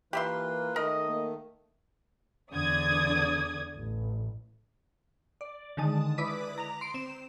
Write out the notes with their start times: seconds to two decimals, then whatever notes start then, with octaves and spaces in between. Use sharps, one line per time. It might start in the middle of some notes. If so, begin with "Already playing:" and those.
0.13 E3 A#3 F4 G4 B4 E5 C6
0.76 D#3 A3 A#4 D#5
1.07 A#3
2.52 E2 D3 D5 D#6 G#6
3.76 A1
5.41 D5
5.77 D3 D#3 G#3 A5 D#6
6.18 E4 B4 D5 D6 D#6 B6
6.58 A#5 F7
6.81 C6 D7
6.94 C4 E7